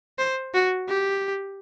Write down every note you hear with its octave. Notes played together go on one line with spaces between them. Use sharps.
C5
F#4
G4